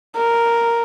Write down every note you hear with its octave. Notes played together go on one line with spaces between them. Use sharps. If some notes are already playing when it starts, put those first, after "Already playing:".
A#4